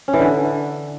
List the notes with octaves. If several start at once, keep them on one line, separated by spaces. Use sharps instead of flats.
C#4
E3
D3